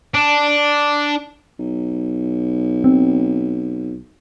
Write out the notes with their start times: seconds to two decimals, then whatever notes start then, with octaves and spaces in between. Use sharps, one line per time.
0.14 D4
1.59 B1
2.84 C4